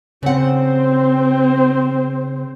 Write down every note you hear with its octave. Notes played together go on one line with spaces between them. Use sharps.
C#3 C4 C5 F#5